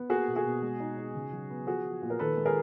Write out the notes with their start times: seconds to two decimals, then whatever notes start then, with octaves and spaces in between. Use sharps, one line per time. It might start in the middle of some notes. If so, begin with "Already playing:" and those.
Already playing: B3
0.10 A#3 F#4 G#4
0.27 B2
0.36 F#4 G#4
0.44 B2
0.62 G#3
0.80 D#4
0.97 D#4
1.15 C#3
1.32 F#3
1.50 B3
1.67 F3 F#4 G#4
1.84 F3
2.02 A#2
2.10 A#4
2.19 D#3 A4 B4
2.37 G#3
2.46 G#4 A#4